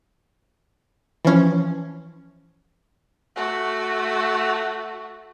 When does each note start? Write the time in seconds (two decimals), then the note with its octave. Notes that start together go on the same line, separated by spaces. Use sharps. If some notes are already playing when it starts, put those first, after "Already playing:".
1.25 E3 F3 C#4
3.36 A3 F#4